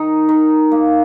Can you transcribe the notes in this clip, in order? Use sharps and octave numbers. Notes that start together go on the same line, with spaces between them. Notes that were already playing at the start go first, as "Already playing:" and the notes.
Already playing: D#3 D#4
D#3
A#3